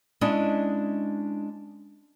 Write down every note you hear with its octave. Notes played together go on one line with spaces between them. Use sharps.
G#3 C#4 D4 E4 D5 D#5